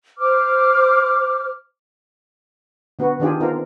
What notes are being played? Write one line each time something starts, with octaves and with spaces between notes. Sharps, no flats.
C5 D6 F6
D3 B3 F#4 B4
D#3 D4 F4 G4 G#4
B3 C4 D#4 F4 A#4